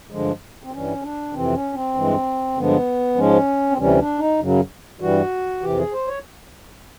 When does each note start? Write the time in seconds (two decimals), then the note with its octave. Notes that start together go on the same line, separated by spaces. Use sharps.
0.11 G2 D3 F3 G#3
0.64 C4
0.71 G2 E3 G3 C#4
1.02 D4
1.33 F2 C3 E3 C4
1.54 C#4
1.73 C4
1.95 G2 E3 G#3
2.56 G2 D3 F3 G#3 B3
3.16 G#2 F3 G#3 C#4
3.71 C4
3.78 D2 C3 E3 G3 C#4
3.99 D4
4.19 D#4
4.40 F#2 C#3 F#3
5.01 G2 E3 G3 F#4
5.61 F2 C3 E3 G4
5.77 G#4
5.93 C5
6.08 C#5